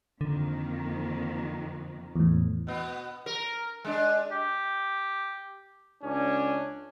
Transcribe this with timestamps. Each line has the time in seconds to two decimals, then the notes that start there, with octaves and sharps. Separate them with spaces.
0.21 F2 D3 D#3 A#3
2.16 E2 A2
2.67 B2 B3
3.26 A#4
3.84 G#3 D4
4.31 G4
6.02 C#2 C#4 D4